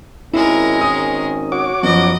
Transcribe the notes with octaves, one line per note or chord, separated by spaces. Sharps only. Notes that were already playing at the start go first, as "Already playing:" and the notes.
G#1 D#3 G#3 C#4 E4 A#4
D#6
F#4 C#5 D6
F#2 F3 B3 D#5